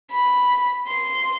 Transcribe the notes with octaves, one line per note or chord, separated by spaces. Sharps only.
B5
C6